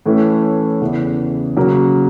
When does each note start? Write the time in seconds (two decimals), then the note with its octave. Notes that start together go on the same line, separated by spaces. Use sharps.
0.06 A2 E3 A3 C#4
0.81 E2 C#3 E3
1.56 C#3 F#3 A#3